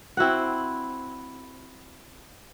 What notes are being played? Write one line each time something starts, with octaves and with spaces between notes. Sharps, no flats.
C4 E4 F#4 F#5